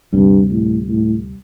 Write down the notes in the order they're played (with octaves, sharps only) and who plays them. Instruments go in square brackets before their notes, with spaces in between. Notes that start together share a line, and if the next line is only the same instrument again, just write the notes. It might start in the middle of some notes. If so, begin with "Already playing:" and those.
[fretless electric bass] D2 C3 G3 [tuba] G2
[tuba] A2
A2